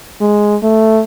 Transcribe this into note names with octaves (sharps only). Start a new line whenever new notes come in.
G#3
A3